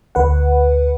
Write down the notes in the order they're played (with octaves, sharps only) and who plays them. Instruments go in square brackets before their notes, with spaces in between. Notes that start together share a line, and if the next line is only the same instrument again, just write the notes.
[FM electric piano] D2 B4 F#5